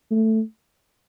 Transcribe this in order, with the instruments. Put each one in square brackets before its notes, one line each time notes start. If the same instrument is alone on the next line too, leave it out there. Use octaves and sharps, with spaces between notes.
[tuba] A3